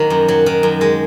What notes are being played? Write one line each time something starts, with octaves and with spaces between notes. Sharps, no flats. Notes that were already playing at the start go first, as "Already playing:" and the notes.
Already playing: D#3 F#3 A#3
F#2
F#3
D#3
F#2
G#3